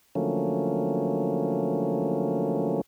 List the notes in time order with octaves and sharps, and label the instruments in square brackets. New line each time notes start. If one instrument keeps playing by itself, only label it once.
[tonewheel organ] D3 F3 F#3 A3 A#3 C#4